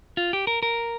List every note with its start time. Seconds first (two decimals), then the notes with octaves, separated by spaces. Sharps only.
0.17 F4
0.33 G4
0.47 A#4
0.63 A#4